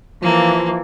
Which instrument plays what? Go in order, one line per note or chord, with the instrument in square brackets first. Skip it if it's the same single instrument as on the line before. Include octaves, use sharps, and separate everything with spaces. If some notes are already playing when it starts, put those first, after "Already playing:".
[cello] E3 [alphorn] F3 [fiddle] A#3